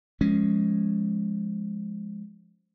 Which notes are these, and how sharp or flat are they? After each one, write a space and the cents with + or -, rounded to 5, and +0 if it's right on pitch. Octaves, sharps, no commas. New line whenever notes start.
F3 +0 G#3 +0 C#4 +0